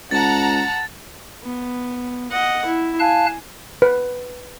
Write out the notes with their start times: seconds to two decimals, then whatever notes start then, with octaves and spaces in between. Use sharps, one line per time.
0.11 C#2 F#5 A5 A#5 A6
1.44 B3
2.31 D#5 F#5
2.65 E4
3.00 F5 G#5 A5 F#6
3.82 B4